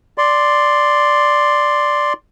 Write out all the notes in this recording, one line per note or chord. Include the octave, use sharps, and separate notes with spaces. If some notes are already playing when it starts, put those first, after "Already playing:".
D5 C6